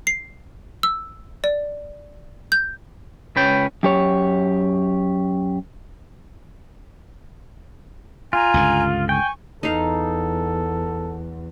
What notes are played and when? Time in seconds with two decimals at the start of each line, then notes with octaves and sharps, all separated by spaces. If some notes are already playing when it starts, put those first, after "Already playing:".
0.07 C7
0.83 E6
1.44 D5
2.52 G6
3.36 C#2 C#4 B4 G5
3.83 F#2 G4 C#5
8.33 F4 G#5 A#5
8.54 C#2 G2 D3
9.09 G5 G#5 C#6
9.63 E2 D#4 A4 F5